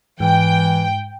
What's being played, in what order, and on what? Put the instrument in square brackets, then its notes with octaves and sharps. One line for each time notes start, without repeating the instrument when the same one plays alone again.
[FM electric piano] G#2 [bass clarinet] E3 [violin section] G5